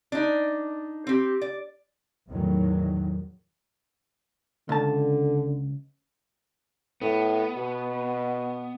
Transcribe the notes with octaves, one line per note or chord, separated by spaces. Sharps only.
D4 D#4
C4 G4
D5
E2 A2 D#3 F#3
C#2 D3 A5
A2 B3
B2